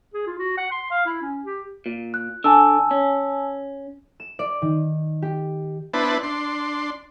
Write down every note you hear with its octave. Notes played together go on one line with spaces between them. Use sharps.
G#4
F4
F#4
F#5
C6
F5
E4
C#4
G4
A#2
F#6
D3 G#5 A5 E6
C#4
E7
D5
D#3
G4
B3 D4 E4 B4 C5 A5
D4 C6